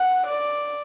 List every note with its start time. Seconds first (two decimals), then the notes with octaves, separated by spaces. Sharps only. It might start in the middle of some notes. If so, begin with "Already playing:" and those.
Already playing: F#5
0.27 D5